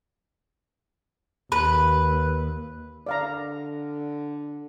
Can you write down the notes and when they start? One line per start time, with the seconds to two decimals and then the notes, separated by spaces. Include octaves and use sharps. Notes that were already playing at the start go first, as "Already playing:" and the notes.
1.52 D#2 B4
3.06 D3 D5 F5 A#5